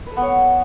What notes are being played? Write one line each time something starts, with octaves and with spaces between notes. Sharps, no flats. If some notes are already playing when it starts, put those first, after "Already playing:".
B4
A4
B3
C#5